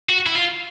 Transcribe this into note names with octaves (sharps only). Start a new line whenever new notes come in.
F#4
E4
F4